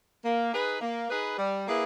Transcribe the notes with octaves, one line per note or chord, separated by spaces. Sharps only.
A#3
D#4 G#4 B4
A#3
D#4 G#4 B4
G3
A#3 E4 G#4 B4